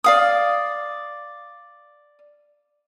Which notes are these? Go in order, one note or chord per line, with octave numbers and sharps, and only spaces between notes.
D5 F5 D#6